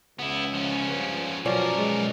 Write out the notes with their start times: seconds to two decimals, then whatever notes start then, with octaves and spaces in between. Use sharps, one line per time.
0.19 C#2 C#3 B3 E4
0.54 F3 C#4
0.91 C#2 G2
1.45 B2 F3 F#3 C#4 A#4 D5
1.78 G#3